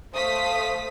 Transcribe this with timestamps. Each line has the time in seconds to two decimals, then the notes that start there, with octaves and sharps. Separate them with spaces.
0.15 A3 C5 F5 D#6 B6